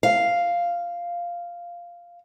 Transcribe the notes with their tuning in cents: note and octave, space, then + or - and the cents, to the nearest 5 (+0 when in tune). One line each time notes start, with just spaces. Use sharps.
F5 -5